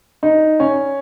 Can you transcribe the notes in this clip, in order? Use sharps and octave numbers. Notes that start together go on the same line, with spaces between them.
D#4
C#4